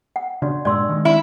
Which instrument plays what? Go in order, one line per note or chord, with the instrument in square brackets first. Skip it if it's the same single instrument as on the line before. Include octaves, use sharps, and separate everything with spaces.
[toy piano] F#5
[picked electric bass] C#3 [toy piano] D4 F#4 D5
[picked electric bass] G2 A#2 G#3 [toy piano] D5 C6 E6
[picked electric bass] D#3 G#3
[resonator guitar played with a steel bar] E4